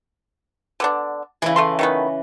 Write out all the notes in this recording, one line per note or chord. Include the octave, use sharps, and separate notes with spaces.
D3 B3 D4
C#3 E3 E4 G#4
A3 A4 C6
D#3 A3 B3